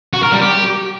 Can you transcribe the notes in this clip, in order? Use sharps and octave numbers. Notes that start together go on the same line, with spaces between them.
F#4
A#4
G3
G4